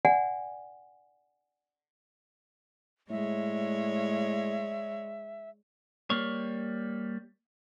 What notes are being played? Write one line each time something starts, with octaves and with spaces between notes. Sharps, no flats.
D5 F#5 G#5
A2 G#3 C#5 D5 E5
G3 A#3 C#5